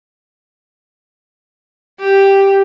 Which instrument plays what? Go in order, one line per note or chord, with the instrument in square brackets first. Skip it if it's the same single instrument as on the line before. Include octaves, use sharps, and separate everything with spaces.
[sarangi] G4